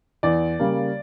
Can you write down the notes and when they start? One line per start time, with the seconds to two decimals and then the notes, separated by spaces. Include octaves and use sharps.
0.23 E2 D5
0.59 C#3 G3 A#3